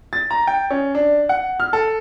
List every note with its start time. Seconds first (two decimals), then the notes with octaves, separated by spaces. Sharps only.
0.13 A6
0.31 A#5
0.47 G5
0.70 C#4
0.95 D4
1.29 F#5
1.60 F6
1.73 A4